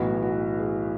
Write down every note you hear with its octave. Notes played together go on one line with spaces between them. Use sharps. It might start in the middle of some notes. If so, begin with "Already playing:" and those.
Already playing: B1 A2 E3 B3 F#4
F#4
G#4